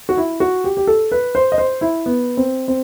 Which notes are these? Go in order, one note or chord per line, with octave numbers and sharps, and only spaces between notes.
F#4
E4
F#4
G4
G4
A4
B4
C5
D#5
C5
E4
B3
C4
C4